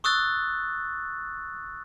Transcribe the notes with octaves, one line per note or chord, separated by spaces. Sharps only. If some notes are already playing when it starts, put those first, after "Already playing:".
C#6 D#6 E6 F#6 A6